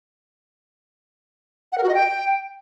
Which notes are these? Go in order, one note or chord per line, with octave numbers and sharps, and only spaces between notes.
F#5
A#4
F#4
D#5
G5